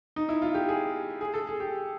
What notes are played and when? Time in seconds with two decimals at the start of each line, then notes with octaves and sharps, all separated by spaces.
0.16 D#4
0.29 E4
0.42 F4
0.54 G4
0.69 G#4
1.21 G#4
1.34 A4
1.47 G#4
1.60 G4